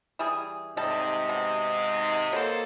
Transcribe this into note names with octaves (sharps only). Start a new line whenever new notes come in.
E3 G3 G#4
G#2 C3 G3 A4 D#5
B2
F#3 A#3 A4 C5